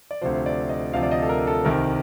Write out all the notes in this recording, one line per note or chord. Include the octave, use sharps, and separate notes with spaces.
D5
D2 C3 F3 C5
D5
D#5
D2 C3 F3 F5
D5
D#5
A4
A#4
A4
C2 C3 D#3 A#4